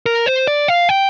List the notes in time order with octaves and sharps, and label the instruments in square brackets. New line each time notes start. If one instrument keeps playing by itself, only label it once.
[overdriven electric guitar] A#4
C5
D5
F5
G5